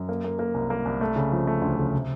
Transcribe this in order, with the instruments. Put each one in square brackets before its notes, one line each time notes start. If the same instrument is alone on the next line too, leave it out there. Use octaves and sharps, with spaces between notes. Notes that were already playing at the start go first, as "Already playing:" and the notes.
Already playing: [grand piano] F#2
A#3
A#3
A#3
C2
A#3
C2
A3
C#3
F3
A3
D2
C#3
C3